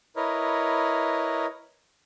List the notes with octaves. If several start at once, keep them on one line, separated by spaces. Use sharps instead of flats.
E4 A#4 B4 C#5 D#5